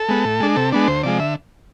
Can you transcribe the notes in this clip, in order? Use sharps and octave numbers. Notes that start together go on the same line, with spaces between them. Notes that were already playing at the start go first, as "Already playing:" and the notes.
Already playing: A4
G#3 B3
A2
G#3 D4
C3 A4
G#3 B3 D4
D2 C5
C3 F3 G#3 D5
D3 E5